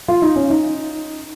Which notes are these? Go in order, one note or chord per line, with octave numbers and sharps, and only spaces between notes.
F4
D#4
C#4
D#4